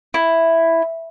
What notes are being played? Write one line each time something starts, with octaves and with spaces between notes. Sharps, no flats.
E4